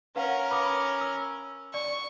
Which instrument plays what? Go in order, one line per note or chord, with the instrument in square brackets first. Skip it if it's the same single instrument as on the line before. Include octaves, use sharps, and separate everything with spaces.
[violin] C#4 A#4 [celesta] B4 F5 F#5
[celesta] B5 D6 D#6
E6
[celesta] D5 [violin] C#6